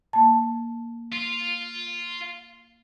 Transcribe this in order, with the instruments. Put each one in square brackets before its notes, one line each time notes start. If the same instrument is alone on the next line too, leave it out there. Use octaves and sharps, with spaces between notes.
[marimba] A#3 A5
[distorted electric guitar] F4